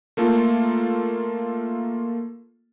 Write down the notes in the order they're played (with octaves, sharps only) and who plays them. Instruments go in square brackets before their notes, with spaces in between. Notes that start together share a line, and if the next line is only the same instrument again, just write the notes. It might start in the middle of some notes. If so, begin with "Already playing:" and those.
[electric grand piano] A3 A#3 F4 A4